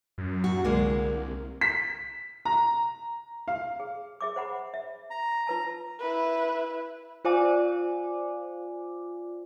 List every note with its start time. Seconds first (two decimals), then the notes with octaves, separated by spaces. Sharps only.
0.18 F#2
0.44 F#4
0.64 C2 D3 G#3 A#3
1.61 B6
2.45 A#5
3.48 F5
3.80 G#4
4.21 G#4 E5 D6
4.36 C5 F#5 B5
4.74 E5
5.10 A#5
5.47 F4 B4 A5
5.99 E4 B4
7.25 F4 C5 D5 F5 G#5 D6